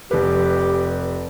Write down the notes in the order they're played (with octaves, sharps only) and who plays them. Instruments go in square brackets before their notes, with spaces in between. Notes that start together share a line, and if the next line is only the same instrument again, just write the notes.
[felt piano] F1 B4 [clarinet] G4